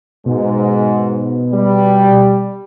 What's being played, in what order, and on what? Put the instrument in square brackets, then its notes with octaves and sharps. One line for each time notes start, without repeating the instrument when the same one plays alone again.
[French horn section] G#2 [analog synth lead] B2
[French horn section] G3